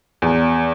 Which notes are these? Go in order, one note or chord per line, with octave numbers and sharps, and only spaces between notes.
E2